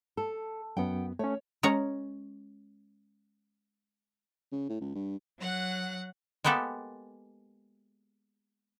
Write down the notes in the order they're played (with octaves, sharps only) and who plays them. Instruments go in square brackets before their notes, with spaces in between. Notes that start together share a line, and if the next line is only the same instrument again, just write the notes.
[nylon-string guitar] A4
[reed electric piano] F#2 B3 [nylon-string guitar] F#5 G5
[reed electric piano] A3 C#4 [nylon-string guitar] C#5
[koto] G#3 C#4 C#5 A#5
[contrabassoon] C#3
A2
C#2
G2
[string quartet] F#3 F#5 F#6
[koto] G#3 A#3 B3 G4 A4